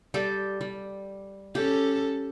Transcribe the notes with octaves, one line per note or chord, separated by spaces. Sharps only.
G3 G4 A4
G3
C#4 G4 A4